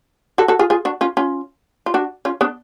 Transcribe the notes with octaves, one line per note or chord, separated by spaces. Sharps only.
F#4 A4
F#4 A4
F4 G#4
F4 G#4
D4 F#4
C#4 F4
C#4 F4
F4
D4 F#4
C#4 F4
B3 D4